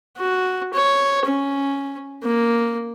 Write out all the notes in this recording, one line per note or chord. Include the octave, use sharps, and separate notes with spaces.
F#4
C#5
C#4
A#3